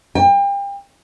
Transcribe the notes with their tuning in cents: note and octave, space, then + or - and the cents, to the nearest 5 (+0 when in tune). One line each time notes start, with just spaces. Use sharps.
G5 +35